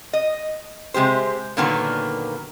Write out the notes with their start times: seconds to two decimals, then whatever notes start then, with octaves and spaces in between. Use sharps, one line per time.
0.13 D#5
0.94 C3 G#3 G4 C5
1.57 A#2 D3 D#3 F#3 A#3 B3